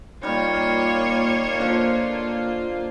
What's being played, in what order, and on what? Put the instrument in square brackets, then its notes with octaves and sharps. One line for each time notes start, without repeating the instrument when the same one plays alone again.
[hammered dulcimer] D#3 G3 [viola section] A#3 F4 [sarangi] C#5
[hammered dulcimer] D3 F3